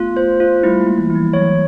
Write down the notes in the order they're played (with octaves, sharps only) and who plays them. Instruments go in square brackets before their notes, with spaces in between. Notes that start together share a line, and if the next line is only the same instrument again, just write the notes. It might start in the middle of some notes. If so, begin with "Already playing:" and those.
Already playing: [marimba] A3 B3 [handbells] F4
[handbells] C5
F4
[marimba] G3 A3 [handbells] E4
[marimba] G#3 A#3
[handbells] E4
[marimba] E3
[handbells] E4
[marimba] F3
[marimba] E3 F#3 [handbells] C#5